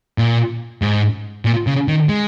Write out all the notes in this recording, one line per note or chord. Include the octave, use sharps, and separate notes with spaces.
A#2
G#2
A#2
C#3
D#3
G#3